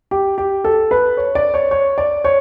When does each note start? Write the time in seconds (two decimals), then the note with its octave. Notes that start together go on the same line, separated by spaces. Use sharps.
0.11 G4
0.38 G4
0.64 A4
0.91 B4
1.17 C#5
1.35 D5
1.54 C#5
1.71 C#5
1.98 D5
2.24 C#5